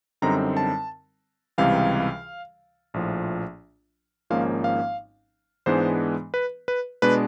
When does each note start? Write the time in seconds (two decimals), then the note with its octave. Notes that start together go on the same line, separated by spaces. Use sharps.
0.22 F#2 D3 G3 C4 D#4 A#5
0.57 A5
1.58 C#2 C3 E3 G3 F5
2.94 A#1 A2 F3
4.30 G#1 G#2 F3 A#3 C#4 F5
4.64 F5
5.66 G#2 E3 G#3 B3 D4 C5
6.34 B4
6.68 B4
7.02 B2 G#3 B3 D4 B4